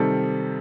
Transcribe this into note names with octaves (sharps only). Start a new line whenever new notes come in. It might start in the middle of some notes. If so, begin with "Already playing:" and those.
Already playing: C3 D#3 G3 A4